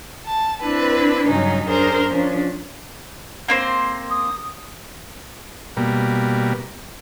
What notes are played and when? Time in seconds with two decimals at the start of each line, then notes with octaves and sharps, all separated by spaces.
0.24 A5
0.61 C4 D4 E4 B4
1.28 G2 C#3 F#3 C#4 D#4
1.67 F#2 D4 G#4 A#4 C5 A#5
2.08 F3 C#4 D4
3.48 A#3 C4 C5
4.11 D#6
5.77 B2 G3 A#3